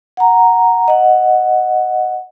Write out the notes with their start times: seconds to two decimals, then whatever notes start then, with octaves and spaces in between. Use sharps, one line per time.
0.17 F#5 A#5
0.88 D#5 F#5